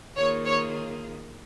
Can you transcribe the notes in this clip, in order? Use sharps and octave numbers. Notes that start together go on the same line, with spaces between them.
D#3 A#3 F4 G#4 C#5
C#5